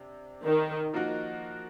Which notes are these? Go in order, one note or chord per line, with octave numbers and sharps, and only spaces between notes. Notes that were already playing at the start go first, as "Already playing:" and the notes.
Already playing: C3 D4
D#3
F3 A#3 D#4 F#4 A#4